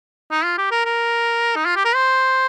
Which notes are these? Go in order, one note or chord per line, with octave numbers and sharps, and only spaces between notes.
D#4
F4
G4
A#4
A#4
D#4
F4
G4
A#4
C5